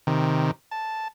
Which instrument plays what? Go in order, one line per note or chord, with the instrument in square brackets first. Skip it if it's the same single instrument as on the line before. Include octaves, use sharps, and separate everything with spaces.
[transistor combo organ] C3 D#3
A5